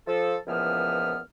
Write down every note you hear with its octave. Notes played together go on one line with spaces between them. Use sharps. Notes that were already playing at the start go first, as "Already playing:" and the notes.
F3 A4
C#2 A#2 E3 F3 B3 F6